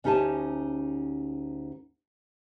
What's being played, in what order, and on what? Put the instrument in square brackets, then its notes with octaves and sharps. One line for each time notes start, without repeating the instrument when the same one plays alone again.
[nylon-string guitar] D2 C#4 D#4 G4 G#5 A5